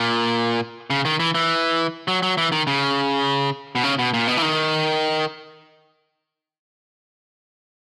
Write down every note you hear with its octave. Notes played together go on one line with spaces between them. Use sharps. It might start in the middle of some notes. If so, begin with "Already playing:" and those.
Already playing: A#2
C#3
D#3
E3
E3
F#3
F#3
E3
D#3
C#3
B2
C#3
B2
A#2
B2
E3
D#3